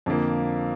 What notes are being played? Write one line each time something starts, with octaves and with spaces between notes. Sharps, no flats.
F2 D3 F3 A#3